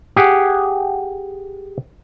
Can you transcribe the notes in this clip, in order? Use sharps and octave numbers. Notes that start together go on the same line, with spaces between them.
G4 G#4 F#5